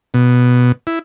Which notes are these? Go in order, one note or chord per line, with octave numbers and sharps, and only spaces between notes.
B2
E4